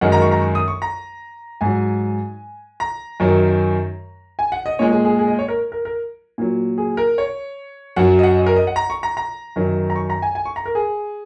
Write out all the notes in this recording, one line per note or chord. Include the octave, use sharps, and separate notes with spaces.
F#2 D#3 G#3 F#5
A#5
C#6
A#5
C#6
D#6
C#6
A#5
G#2 F#3 G#5
A#5
F#2 D#3 F#3
G#5
F#5
D#5
A#2 G#3 C#5
G#4
G#4
G#4
D#5
C#5
A#4
A#4
A#4
A#2 F#3
G#4
A#4
C#5
F#2 F#3 F#5
D#5
F#5
D#5
A#4
D#5
F#5
A#5
C#6
A#5
A#5
F#2 D#3 F#3
A#5
C#6
A#5
G#5
G#5
C#6
A#5
A#4
G#4